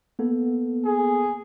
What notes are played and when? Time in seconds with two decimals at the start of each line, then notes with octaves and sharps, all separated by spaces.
0.19 A#3 B3 A4
0.85 G#4